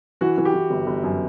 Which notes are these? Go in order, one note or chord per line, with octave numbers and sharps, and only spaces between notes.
E3 F#4
E3
G4
E3
G1
G1
F#2